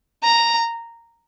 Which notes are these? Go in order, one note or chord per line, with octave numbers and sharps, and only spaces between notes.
A#5